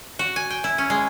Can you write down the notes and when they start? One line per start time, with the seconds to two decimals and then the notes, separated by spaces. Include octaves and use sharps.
0.19 F#4
0.36 G#5
0.50 G5
0.64 E4
0.78 C#4
0.90 G#3